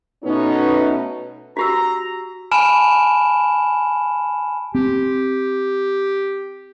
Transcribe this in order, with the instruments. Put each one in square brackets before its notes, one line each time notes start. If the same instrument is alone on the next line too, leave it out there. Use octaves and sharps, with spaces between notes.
[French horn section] B2 A3 B3 C#4 D#4
[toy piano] F#4 G4 E6 [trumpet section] A#5
[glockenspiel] G#5 A5 B5 F6 D7 E7
[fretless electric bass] C4 [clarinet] G4